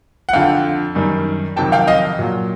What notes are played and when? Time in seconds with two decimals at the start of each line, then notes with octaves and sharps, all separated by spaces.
0.29 F#5
0.33 F2 D3 F3 F5 G5
0.95 F#2 D#3 G3
1.56 F2 C3 D#3 F#3 G5 A5
1.72 F5 G5
1.87 D#5 F5
2.19 A#2 F#3